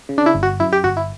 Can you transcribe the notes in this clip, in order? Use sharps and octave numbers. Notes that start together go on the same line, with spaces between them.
C#3
D4
E4
G1
F#4
F#2 E4
G4
G1 F#4
E4